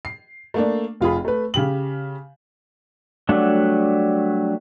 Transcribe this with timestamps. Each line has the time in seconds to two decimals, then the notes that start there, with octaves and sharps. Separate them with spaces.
0.05 C7
0.54 A3 A#3 D4
1.01 F1 F4 G#4 B5
1.25 A3 B4
1.54 C#3 G4 F#7
3.29 F#3 G3 A3 D4 F#5